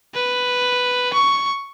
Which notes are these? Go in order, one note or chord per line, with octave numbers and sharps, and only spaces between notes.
B4
C#6